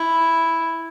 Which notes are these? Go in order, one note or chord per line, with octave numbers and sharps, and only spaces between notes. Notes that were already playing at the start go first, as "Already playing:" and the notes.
Already playing: E4